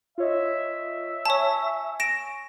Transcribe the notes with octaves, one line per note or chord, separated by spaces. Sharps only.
F4 C#5 D#5 E5
C#5 G#5 A5 C#6
A#6 D7 E7